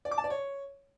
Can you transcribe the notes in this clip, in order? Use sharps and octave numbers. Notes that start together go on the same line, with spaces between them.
D5
D6
A5
D5
C#5